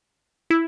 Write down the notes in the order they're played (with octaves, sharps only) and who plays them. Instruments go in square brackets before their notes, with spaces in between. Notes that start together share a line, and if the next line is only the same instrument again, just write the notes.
[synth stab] E4